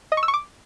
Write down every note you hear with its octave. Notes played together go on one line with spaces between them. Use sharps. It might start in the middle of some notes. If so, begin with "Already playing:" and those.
D#5
C#6
E6
C#6
D6